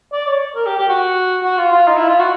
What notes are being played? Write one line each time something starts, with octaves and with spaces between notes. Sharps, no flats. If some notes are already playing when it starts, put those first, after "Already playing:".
D5
C#5
A#4
G4
G4
F#4
F#4
F4
F4
D#4
E4
F4
F#4